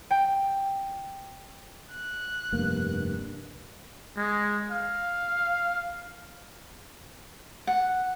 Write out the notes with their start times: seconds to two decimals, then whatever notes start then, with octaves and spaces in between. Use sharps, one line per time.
0.11 G5
1.91 F#6
2.53 F1 G2 A#3
4.16 G#3
4.70 F5
7.67 F#5